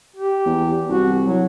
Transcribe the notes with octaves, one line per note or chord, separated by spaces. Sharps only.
G4
E2
C2 F#4
F#3